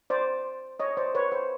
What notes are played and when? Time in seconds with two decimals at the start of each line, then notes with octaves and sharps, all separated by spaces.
0.10 C5 D5
0.80 C#5 D#5
0.97 C5 D5
1.15 B4 C#5
1.32 C5